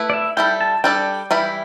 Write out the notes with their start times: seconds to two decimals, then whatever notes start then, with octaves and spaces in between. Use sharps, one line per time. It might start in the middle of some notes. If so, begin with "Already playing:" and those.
Already playing: A3 E4 B4
0.10 D5
0.13 E5
0.37 G3 E4 A4 G5
0.61 A5
0.84 G3 D4 A4 D5 G5
1.31 E3 G3 E4